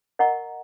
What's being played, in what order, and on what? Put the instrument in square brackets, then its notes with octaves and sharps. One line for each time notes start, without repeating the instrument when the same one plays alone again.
[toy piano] A#4 D#5 F#5 A#5 C#6